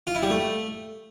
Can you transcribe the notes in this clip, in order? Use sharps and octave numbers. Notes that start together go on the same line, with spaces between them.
F4
E4
G3
A3